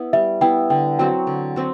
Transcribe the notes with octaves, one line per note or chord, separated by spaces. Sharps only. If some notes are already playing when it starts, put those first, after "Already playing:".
Already playing: B3 E4
G3 E5
B3 E4 G5
D3 G5
F#3 C4 F#4 G5
D3
F#3 C4 F#4